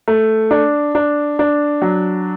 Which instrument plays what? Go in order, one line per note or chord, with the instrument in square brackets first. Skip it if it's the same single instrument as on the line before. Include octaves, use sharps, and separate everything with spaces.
[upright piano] A3
D4
D4
D4
F#3